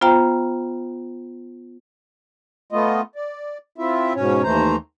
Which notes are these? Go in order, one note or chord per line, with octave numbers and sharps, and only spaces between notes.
B3 F4 C5 F5 G5 A#5
A3 B3 F4 D#5
D5
C4 E4 F4 E5
G#2 B2 C#4 C#5
D#2 E3 A3 C5 A#5